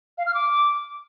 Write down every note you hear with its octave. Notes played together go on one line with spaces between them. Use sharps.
F5
F6
D6